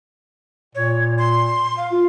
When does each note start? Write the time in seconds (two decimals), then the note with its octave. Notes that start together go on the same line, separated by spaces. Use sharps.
0.75 A#2 C#5
1.18 C6
1.77 F5
1.92 F4